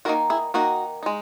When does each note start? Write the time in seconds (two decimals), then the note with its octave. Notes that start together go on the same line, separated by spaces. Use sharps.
0.05 D#3 A#3 D#4 F#4 A#4
0.30 E4 G#4
0.54 D#3 A#3 D#4 F#4 A#4
1.03 G#3 D#4